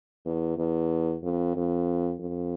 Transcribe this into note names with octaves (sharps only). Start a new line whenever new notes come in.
E2
E2
F2
F2
F2